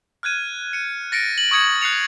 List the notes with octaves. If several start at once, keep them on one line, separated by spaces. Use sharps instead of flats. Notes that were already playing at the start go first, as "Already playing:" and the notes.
F6 F#6 G#6 D#7
C#7 D#7
A6 A#6 C#7 D7
F#7
C#6 D#6 G#6 C#7 D7
F#6 C7 C#7 F7